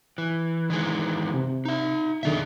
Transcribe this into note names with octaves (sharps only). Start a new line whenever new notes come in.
E3
D#3 E3 G#3
C3
D#4 E5
F2 B2 D3 D#3 G#4 E5